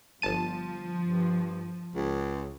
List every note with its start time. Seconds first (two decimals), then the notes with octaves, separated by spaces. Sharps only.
0.22 G1 F3 A5 D#7
1.06 G2
1.95 C#2